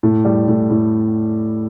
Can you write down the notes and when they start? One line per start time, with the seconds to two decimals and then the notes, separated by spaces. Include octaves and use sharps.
0.03 A2
0.25 G3
0.48 A2
0.71 A2